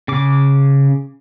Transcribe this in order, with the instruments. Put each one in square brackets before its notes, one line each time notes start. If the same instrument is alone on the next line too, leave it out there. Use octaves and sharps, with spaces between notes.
[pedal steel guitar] C#3 D6